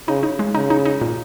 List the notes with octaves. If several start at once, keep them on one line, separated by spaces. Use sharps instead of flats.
C#3 D#4
D#4
G#3
C#3 D#4
D#4
D#4
A#2